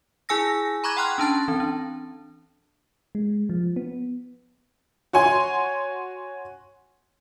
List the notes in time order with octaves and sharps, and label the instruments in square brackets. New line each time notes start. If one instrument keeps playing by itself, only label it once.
[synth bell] E4 G#4 G#5 E6 A#6
A#5 B5 C#6 D6 F#6 G#6
F#5 G5 C6 F6 F#6
C#4 D4 A5 A6
E3 C4
D4
[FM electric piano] G#3
F3
B3
[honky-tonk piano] F#4 C#5 G#5 C6